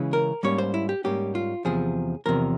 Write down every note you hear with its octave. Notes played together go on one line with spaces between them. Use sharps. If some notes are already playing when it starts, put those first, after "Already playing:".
Already playing: C#3 E3 G#3 C#4
A#4
G#2 G3 A#3 C#4 C#5
C5
E4
G4
G#2 G3 A#3 C#4 G4
F4
E2 C3 F3 G#4
E2 C3 F3 A#4